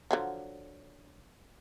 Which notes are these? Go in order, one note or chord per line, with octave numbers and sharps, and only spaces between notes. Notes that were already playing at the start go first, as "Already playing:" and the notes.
D3 F3 F#3